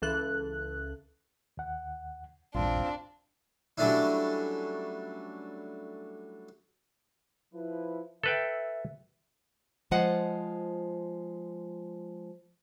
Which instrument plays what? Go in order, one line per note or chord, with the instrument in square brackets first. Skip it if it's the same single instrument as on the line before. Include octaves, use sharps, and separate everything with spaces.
[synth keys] C#2 E3 A4 F#6
[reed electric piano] D#2 F#5
[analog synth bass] A#1 [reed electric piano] E2 G2 [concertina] C4 F4 [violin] D4
[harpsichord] F#3 G3 A3 C#4 D4 E4
[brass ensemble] F3 E4 B4
[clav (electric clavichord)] A4 B4 G5 [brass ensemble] E5
[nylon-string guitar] F3 G#3 F4 C5 D#5 F#5